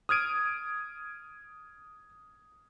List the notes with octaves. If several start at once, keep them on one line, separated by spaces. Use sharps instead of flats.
D#6 F6 G#6 D7 D#7